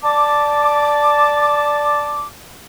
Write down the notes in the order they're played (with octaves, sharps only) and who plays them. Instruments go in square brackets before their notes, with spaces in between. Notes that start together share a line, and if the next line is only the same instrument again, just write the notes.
[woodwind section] D5 A5 D6